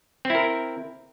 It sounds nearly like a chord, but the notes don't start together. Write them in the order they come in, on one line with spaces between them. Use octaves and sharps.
C4 E4 A#4